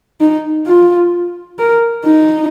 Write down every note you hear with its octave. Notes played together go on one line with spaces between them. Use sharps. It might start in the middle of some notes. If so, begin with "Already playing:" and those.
D#4
F4
A#4
D#4